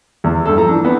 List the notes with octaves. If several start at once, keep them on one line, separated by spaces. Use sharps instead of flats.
E2
G2 A4
F3 A3 A#5
E3 D4
B3 C4